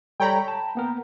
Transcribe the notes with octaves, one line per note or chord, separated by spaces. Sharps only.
G3 A4 C#5 G5 A#5 B5
A5
A#3 B3 A#4